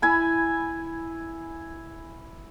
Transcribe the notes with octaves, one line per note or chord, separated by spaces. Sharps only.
E4 G#5 B5